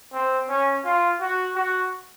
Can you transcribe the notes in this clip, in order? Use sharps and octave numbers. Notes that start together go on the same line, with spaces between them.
C4
C#4
F4
F#4
F#4